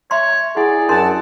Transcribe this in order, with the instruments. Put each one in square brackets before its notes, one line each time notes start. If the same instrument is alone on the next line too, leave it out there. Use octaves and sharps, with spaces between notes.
[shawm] C#5 [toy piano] E5 A#5 C6
[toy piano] E4 F#5 [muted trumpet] G#4 [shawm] D5
[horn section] F#2 F#5 A5 [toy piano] D4 A#4 C6